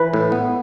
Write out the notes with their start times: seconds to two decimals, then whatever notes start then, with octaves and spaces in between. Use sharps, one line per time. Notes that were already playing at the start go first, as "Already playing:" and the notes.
Already playing: E3 B4
0.14 A2
0.32 B3